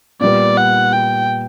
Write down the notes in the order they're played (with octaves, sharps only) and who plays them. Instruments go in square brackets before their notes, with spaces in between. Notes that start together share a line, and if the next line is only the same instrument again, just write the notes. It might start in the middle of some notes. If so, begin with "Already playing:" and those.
[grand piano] A#2 G3 B3 [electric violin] D5
[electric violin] F#5
G5